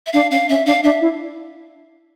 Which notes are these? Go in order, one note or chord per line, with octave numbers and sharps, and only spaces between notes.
E5
D4 F5
C#4 F5
C#4 E5
D4 F5
D4 E5
E4